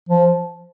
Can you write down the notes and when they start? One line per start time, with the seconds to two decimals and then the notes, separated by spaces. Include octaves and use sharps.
0.09 F3